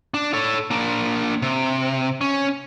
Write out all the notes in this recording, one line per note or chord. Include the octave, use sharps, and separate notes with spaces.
D4
A4 C#5
A#3 D4
C3
C#4